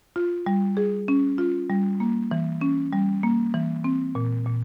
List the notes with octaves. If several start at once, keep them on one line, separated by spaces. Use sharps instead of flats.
F4
G3
G#4
C#4
F4
G3
A#3
E3
C#4
G3
A#3
E3
C4
A#2
A#2